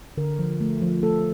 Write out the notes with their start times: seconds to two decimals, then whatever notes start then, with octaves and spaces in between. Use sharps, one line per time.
0.17 D3 A#4
0.39 F3
0.61 A3
0.82 F3
1.03 A3 A4